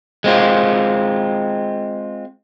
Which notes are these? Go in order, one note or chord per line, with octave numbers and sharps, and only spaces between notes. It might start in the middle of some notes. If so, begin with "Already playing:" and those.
G#3 C4 F4